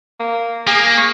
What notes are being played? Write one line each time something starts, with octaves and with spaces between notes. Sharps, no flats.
A#3
A#3 G#4
C#6